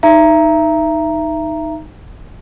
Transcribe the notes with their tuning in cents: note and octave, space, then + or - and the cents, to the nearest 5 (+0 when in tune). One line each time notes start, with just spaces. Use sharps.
D#4 +0 E5 +25 A#5 +0